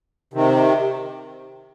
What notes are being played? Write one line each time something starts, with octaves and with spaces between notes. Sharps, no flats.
C3 D#3